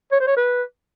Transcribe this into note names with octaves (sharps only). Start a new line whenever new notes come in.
C#5
C5
C#5
B4